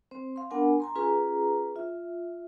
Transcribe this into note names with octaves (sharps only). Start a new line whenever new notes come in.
C4 C5
F5 C6
B3 D4 A#4 F#5 G#5
G#5 A#5 C6
C#4 F4 G#4 B4 A#5
F4 E5